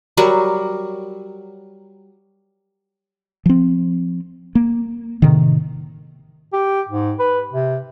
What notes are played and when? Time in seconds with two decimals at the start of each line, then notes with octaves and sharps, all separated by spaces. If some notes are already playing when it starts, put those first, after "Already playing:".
0.17 F#3 G3 A#4 C#6
3.46 F3 C4
4.55 A#3
5.22 A2 C3 D#3
6.53 G4
6.89 G#2
7.19 B4
7.53 C3